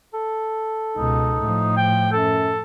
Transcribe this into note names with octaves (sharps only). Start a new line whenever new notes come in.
A4
C#2 B2 D#4
A2 F3
G5
F#2 A4